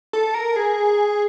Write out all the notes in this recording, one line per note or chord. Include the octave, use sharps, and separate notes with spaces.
A4
A#4
G#4